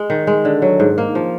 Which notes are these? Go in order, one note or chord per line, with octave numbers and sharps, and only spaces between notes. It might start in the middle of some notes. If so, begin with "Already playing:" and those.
Already playing: G#3
D#3
G#3
D3
F#3
G#2
A#3
F3